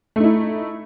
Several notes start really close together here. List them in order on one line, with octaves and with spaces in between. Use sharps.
A3 D#4 E4